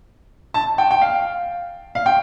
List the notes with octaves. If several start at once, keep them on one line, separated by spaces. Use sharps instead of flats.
A5
G5
G5
F5
F5
G5